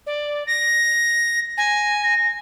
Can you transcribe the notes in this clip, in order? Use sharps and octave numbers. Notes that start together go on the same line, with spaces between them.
D5
A#6
G#5 A#6
A#6